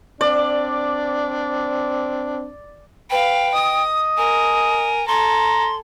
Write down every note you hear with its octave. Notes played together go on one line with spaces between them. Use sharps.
C4 D4 D5
B4 F5 G5
D#5 D#6
A#4 G#5
A4 G#5 A#5 C6